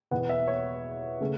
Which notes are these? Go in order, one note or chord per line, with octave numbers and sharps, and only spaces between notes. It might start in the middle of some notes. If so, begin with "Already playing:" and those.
E2 B2 B3 F#5
E5
C#5
C#3 A3 C#4